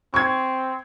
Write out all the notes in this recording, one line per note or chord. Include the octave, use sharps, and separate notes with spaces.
C4 C#6 G#6